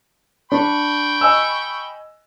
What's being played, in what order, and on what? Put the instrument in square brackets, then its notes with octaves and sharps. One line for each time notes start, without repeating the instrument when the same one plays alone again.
[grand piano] D4 [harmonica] G5 B5 C#6
[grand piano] D#5 G#5 E6